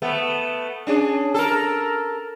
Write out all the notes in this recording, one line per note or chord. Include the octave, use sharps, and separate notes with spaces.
A3 B3
C#4 D4 G#4
A4 A#4